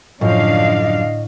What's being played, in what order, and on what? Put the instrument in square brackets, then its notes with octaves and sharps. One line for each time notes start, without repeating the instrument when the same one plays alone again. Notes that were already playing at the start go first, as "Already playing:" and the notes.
[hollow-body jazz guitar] F#2 F3 [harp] A2 [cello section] D3 D4 F5 [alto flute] D#5